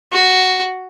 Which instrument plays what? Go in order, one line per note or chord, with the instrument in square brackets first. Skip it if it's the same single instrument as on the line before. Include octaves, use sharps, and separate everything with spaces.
[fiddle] F#4